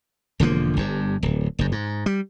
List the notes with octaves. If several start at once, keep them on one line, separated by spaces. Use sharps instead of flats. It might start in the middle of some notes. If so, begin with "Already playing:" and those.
E1 D3 F3 A#3
G1 G2
D1
F#1 F#2
G#2
G3